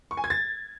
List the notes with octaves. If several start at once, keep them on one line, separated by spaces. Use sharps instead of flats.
C#6
G#5
G#6
A6